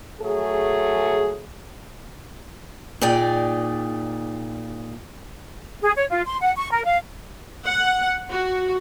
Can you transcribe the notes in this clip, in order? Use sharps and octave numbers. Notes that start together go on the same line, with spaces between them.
F#3 A3 G#4
A#2 D#4 G#4 D5 G5
G#4
C#5
F4
C6
F#5
C#6
A#4
F5
F#5
F#4